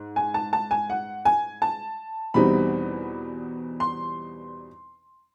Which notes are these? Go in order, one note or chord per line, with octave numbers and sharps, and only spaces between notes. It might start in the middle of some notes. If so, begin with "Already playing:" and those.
Already playing: G#2
G#5
A5
A5
G#5
F#5
G#5
A5
E2 B2 G3 C4 D#4 B5
C6